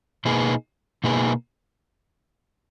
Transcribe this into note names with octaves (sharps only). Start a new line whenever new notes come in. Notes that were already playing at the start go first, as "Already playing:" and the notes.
B2 A#3 D#4 G#4 B4
B2 A#3 D#4 G#4 B4